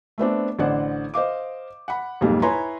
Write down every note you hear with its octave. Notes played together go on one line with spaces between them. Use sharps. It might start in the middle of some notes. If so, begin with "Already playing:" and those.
A3 B3 C4 D4
A1 D3 C5 D5 F#5
C5 D#5 F5 D6
F#5 B5
B1 F2 G#2 G3 A#3
E4 B4 C#5 G#5 A#5 C6